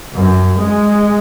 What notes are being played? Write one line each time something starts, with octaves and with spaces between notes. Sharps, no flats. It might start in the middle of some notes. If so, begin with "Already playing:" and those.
F#2
G#3